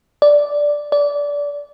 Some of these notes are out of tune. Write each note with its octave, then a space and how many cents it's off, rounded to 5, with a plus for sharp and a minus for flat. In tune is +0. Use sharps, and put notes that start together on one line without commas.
D5 -5
D5 -20